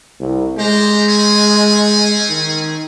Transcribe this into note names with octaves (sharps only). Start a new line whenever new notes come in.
C2
G#3 G4 C5 A#5
C4 C#4 G#4
D#3